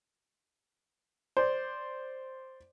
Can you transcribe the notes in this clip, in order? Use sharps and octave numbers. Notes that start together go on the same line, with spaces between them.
C5 D5